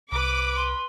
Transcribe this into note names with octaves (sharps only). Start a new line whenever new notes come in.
C2 B4 D6
C6